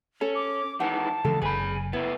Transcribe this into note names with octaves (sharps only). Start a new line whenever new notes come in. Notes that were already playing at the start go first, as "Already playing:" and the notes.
C#4 A4
D6
D#3 E3 G#3 F#5 A5
F2 C#3 E3 G#3 A4
F#1 C#3 G#4 B4 G#5 B5
A2 B3 E4